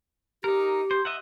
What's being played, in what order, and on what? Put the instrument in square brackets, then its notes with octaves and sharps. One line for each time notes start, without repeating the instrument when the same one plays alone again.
[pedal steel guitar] D#4 A#4 [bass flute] G4
[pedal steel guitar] C5
D#5 E5 F#5